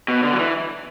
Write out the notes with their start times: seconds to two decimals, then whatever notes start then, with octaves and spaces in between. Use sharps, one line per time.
0.08 B2
0.23 D3
0.33 F#3
0.39 E3